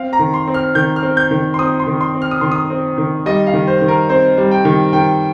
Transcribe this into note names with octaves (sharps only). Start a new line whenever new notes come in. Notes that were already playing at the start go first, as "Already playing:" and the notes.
Already playing: C4 F5
A#5
D#3
C6
C4
F6
D#3 G6
F6
C4
G6
D#3
C6
C4 D#6
C6
D#3
C6
C4
F6
D#6
D#3 C6
D#6
C4
D#3
G3 D#5
F5
D#3
C5
D#3
A#4
C4 C5
G3
G5
D#3
D#3 G5